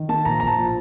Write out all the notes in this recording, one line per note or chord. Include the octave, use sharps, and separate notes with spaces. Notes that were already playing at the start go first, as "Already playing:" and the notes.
Already playing: D#3
A#3 A5
A#1 A#5
A#1 A#5
A5
A#2